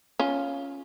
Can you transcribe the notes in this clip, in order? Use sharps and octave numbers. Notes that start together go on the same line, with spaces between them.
C#4 F4